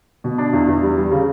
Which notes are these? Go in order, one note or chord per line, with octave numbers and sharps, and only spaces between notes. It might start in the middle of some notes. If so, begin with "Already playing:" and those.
B2
D4
E2
E2
G3
G3
C#3